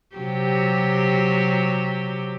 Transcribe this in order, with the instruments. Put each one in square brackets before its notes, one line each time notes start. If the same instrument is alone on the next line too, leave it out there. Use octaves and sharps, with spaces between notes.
[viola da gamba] C3 F#3 G4